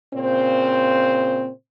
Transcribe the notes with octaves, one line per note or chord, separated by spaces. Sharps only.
A#2 C#3 C4 C5